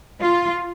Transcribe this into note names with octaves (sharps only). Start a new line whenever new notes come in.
F4